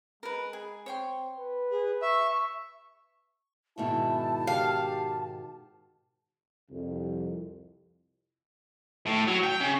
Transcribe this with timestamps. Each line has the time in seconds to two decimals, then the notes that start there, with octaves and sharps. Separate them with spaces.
0.23 G#3 A#4 B4
0.53 G#4
0.86 C4 C#5 G5 C6
1.38 B4
1.71 G#4
2.02 E5 C#6
3.78 G#2 B2 D#3 E4 A5
4.47 G4 F5
6.70 C2 F2
9.07 A2
9.28 F#3
9.44 G5
9.60 C#3